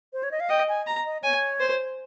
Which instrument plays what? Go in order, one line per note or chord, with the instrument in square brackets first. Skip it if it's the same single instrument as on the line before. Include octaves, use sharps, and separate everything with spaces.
[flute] C5
C#5
D#5
F5
[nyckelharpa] D#5 [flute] G5
[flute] G#5
[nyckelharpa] A#5
[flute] D#5
[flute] C#5 [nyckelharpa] G#5
[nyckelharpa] C5